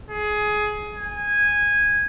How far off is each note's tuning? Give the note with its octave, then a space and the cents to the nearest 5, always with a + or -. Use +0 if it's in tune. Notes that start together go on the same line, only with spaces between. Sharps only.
G#4 +20
G#5 -10